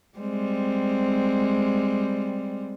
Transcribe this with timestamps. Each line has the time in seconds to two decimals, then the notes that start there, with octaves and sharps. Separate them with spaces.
0.18 G3 G#3 C4